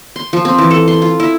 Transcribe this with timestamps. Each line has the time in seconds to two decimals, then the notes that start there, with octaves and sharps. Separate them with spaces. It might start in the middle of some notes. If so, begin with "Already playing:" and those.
0.16 C6
0.33 F3
0.45 C4
0.58 E3
0.71 A4
0.88 C6
1.02 F4
1.20 E4